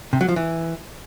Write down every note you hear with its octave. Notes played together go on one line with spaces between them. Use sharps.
C3
F#3
F3
E3